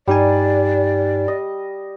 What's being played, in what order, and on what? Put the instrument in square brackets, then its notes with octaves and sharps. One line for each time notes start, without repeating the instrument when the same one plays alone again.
[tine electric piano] G2 D#4 G#5 [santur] G3 [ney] D5
[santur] D#5